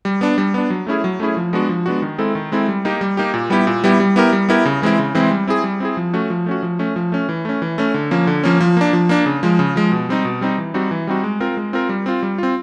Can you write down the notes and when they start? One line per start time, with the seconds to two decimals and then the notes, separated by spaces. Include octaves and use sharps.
0.05 G3
0.21 B3 D4
0.38 G3
0.54 B3 D4
0.70 F#3
0.87 A3 C#4 E4 G#4
1.04 F#3
1.20 A3 C#4 E4 G#4
1.37 F3
1.53 G#3 B3 D4 F#4
1.69 F3
1.86 G#3 B3 D4 F#4
2.02 D#3
2.18 G#3 C4 E4 A4
2.35 D#3
2.52 G#3 C4 E4 A4
2.68 G3
2.85 A#3 D#4 G4
3.01 G3
3.17 A#3 D#4 G4
3.34 A#2
3.50 G3 B3 E4 G4
3.67 A#2
3.84 G3 B3 E4 G4
4.00 G3
4.16 B3 E4 G4 A#4
4.33 G3
4.49 B3 E4 G4 A#4
4.65 C#3
4.82 E3 G#3 C4 E4
4.99 C#3
5.15 E3 G#3 C4 E4
5.31 G3
5.47 C4 E4 G#4
5.64 G3
5.80 C4 E4 G#4
5.97 F3
6.13 A3 C#4 F#4
6.30 F3
6.46 A3 C#4 F#4
6.63 F3
6.79 A3 C#4
6.96 F3
7.12 A3 C#4
7.29 E3
7.45 A3 C#4
7.62 E3
7.78 A3 C#4
7.94 D3
8.11 F3 A#3 C#4
8.27 D3
8.44 F3 A#3 C#4
8.60 F3
8.77 A#3 D4
8.93 F3
9.09 A#3 D4
9.26 C#3
9.43 F3 G#3
9.59 C#3
9.76 F3 G#3
9.92 B2
10.09 G3 C4 D#4
10.25 B2
10.41 G3 C4 D#4
10.58 E3
10.74 G3 C4 D#4 F#4
10.91 E3
11.07 G3 C4 D#4 F#4
11.24 G#3
11.40 C4 F4 A#4
11.57 G#3
11.73 C4 F4 A#4
11.89 G3
12.06 C4 F4
12.23 G3
12.38 C4 F4